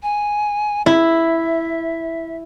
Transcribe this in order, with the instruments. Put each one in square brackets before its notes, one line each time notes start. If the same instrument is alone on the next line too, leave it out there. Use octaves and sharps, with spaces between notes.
[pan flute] G#5
[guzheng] E4 [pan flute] E5